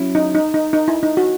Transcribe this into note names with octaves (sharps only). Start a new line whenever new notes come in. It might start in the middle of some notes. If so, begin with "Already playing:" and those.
Already playing: F#3 C#4 E4
D#4
D#4
D#4
D#4
E4
D#4
F#4